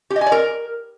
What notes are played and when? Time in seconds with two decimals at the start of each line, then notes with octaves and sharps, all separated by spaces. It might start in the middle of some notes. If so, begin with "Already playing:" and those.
0.10 G4
0.16 D#5
0.21 G#5
0.27 D5
0.32 A#4